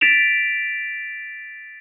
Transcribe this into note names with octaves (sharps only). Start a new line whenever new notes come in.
A6 B6 D7 E7 F7